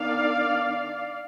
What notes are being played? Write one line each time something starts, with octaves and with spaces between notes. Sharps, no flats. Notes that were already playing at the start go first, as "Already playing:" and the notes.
Already playing: D#3 B3 D4 D5 F5